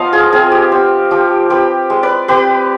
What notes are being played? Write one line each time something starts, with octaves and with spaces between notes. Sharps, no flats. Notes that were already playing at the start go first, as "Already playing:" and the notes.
Already playing: F3 B3 D#5 F5
F4 G#4
C4 F4 G#4
G4
C4 G4
F3 G4
C4 G4 B4
G#3
B4 D5
C4 G4 B4